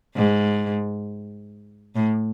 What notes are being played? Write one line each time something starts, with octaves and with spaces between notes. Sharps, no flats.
G#2
A2